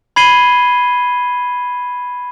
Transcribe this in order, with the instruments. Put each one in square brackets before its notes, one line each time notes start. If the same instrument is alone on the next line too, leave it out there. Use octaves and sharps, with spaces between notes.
[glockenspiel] B5 G#6 C7 D#7 G7